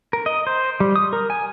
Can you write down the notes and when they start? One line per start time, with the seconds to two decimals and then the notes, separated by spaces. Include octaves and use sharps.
0.13 A#4
0.26 D#5
0.47 C5
0.80 G3
0.96 D#6
1.13 A#4
1.30 G#5